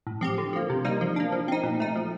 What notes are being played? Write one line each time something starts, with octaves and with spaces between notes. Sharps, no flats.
A2
F3 C4 G4
D3
F3 A#3
C3
G3 A#3 D#4
F3
A#3 D4
F3
C4 D#4
A#2
A3 D#4
F3